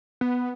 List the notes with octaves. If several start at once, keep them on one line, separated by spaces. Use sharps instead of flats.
B3